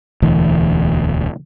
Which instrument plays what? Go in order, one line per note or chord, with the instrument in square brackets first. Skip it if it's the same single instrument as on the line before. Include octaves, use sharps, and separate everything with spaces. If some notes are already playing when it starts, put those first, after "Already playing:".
[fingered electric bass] E1 D2 E3